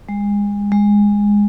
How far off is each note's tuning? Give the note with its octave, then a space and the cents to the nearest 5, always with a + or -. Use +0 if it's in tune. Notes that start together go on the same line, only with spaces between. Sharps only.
G#3 -30
G#3 -15